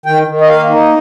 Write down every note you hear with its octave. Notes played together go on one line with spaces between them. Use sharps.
D#3 G5
D#3
D#5
A#3 F5
D#4